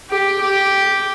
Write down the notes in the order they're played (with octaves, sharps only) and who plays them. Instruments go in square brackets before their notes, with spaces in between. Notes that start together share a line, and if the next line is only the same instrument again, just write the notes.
[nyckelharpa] G4
G4